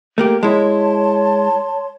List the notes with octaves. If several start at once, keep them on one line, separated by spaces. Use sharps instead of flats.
A3 A#3 G4
G#3 E4 C#5 A5 C6